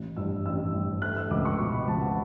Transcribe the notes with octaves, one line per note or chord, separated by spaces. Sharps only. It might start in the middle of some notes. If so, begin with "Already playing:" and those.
Already playing: A1
G2 E6
A1 E6
G2
A3 F#6
E6
C#2 D6
C#6
B2 C#6
B5
C#2 A5
F#5